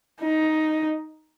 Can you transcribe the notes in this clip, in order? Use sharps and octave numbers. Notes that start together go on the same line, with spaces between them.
D#4